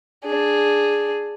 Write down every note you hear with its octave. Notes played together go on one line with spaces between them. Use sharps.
D4 G#4